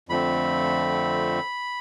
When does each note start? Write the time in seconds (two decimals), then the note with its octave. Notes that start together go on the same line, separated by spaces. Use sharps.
0.09 F2 D3 F3 A3 C4 B5